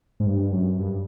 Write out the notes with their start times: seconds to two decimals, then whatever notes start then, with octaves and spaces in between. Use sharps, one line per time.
0.20 G#2
0.26 G2
0.52 F#2
0.79 G2